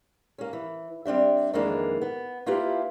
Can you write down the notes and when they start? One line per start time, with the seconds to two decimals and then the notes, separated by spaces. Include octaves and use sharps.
0.38 A#3 C#4
0.53 E3
1.05 G3 C4 D4 E5
1.53 F2 D#3 E3 G#3 A#3 D4
2.02 B3
2.46 A#3 E4 F4 G4 B4